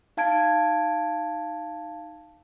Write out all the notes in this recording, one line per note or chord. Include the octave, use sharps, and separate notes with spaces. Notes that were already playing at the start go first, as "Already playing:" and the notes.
D#4 F5 A5 G#6 D7